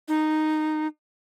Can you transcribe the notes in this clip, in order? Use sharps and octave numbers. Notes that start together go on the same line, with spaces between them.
D#4